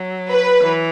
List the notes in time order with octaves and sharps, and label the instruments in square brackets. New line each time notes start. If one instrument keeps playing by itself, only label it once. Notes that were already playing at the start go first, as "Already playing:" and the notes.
Already playing: [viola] F#3
[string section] B4
[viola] E3